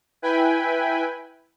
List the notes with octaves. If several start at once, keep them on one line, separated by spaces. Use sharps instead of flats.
E4 B4 G5 G#5 B5